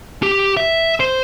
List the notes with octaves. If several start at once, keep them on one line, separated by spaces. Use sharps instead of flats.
G4
E5
C5